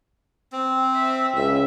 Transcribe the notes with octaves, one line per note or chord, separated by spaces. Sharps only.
C4
E5
C#2 E5